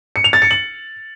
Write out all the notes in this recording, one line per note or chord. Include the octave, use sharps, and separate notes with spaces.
C#7
F7
A6
C#7
F#7